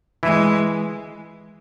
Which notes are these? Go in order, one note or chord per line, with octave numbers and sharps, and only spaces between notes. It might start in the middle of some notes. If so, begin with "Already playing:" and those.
E3 G#3 E4